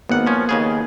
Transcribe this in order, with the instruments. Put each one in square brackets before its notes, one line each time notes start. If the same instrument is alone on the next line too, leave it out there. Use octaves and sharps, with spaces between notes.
[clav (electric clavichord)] G#1 F#5 [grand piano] A#3 B3
[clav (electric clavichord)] F3 C#4
D#2 C#3 G#4